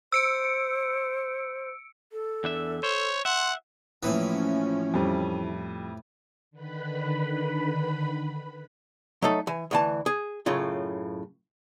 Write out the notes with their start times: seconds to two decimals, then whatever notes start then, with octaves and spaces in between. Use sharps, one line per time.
0.12 C5 E6 C#7 D7
2.12 A4
2.44 E2 D4 E5
2.83 C5 C#5
3.25 E5 F#5 C6
4.03 A2 E3 F3 A#3 C#4 E4 B4 D#6
4.94 F2 G3
6.51 D3 D#3 B4 B5
9.22 F#3 A3 D#4 A4
9.47 E3 G#5
9.71 D2 E3 A5
10.06 G#4
10.46 F#2 A2 C#3 F4